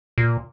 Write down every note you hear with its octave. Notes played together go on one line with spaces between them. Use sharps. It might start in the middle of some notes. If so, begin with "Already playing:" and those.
A#2